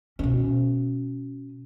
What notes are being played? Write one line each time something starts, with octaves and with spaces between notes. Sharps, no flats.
B2 C#4